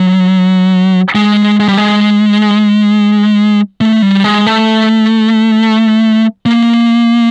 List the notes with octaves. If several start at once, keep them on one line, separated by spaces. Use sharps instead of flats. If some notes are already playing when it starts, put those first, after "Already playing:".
Already playing: F#3
G#3
G#3
G3
G#3
A3
G3
G#3
A3
A#3